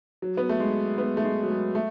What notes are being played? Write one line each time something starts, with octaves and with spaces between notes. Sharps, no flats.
F#3
B3
A3
G#3
B3
A3
G#3
F#3
G#3
A3